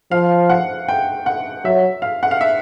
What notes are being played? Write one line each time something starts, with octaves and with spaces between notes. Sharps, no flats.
F3 F5
F#5
G5
F#5
F#3 E5
F5
F#5
F5
E5